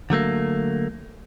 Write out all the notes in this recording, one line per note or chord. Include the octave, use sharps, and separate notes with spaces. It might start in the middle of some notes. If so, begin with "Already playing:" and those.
D3 F#3 A3 A#3